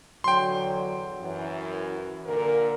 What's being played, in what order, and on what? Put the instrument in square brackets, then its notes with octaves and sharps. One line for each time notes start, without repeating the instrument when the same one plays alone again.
[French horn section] E2 D3 F#3 [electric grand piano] G5 C6
[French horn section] F#2 E3
A#2 D3 A#4